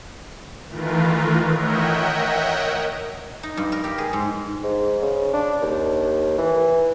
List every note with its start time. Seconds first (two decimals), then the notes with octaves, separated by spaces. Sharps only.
0.68 D#3 E3 A3 F4 A#4 B4
1.52 A#4 C#5 D#5 E5 F#5 G5
3.43 D#4
3.57 G2
3.72 A#4
3.84 G4
3.98 G#4
4.13 G#2
4.64 G#2
5.02 C#3
5.33 D4
5.62 D#2
6.38 E3